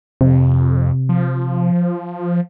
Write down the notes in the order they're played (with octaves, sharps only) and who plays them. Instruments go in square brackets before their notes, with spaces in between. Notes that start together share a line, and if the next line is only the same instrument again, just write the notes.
[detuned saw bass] F2 [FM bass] C3
[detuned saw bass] F3